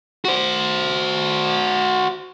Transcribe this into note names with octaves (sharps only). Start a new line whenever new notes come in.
F#4 C5